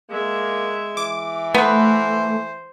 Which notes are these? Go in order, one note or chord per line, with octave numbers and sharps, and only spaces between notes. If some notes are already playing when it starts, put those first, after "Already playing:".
G#3 A#3 E5
E3 D6
A3 B3 B4 C5